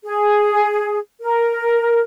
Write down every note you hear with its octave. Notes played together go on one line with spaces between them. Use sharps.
G#4
A#4